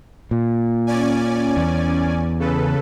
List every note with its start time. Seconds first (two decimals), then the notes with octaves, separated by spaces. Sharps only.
0.31 A#2
0.87 C#4 D5 G#5
1.57 E2
2.39 C#3 A4 B4